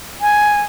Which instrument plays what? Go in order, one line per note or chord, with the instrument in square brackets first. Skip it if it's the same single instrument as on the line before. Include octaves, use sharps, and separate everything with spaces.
[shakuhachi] G#5